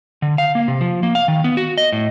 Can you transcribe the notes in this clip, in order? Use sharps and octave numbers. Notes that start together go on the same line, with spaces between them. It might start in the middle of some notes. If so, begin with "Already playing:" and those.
D3
F5
A#3
C3
F3
A#3
F5
D#3
B3
F#4
D#5
A2